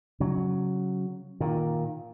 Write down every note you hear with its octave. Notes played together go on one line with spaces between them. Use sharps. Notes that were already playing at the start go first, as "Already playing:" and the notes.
C#3 F#3
A#2 D#3